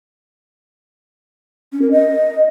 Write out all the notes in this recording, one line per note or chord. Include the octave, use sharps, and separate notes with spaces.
C#4
A#4
D#5